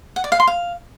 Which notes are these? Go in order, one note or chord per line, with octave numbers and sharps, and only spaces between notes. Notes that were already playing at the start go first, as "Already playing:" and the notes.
F#5
D5
F5
C6
F5